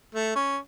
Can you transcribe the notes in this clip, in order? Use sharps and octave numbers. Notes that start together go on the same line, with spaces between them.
A3
C#4